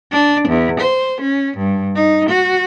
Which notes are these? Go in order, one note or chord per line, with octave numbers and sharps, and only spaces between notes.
D4
E2
C5
C#4
G2
D#4
F#4